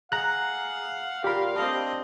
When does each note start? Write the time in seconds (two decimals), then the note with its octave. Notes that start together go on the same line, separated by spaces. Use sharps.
0.12 G#4 F5 F#5 A#5 F#6
1.24 A#2 F4 G4 A#4 B5
1.56 C4 D4 D#5